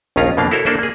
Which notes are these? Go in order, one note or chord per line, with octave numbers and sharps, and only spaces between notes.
A#1 D#2 D#3 C#4 F4 A#5
F2 B2 A#3 D4 F5
E4 F#4 A4 A#4 C5 C#5
A#3 D4 A4 C5 D5 E5
A#3 G#4